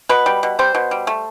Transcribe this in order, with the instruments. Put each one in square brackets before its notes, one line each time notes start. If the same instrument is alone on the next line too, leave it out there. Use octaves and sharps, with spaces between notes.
[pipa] B2 B4
G3
B2
G3 C5
B2
G3
A3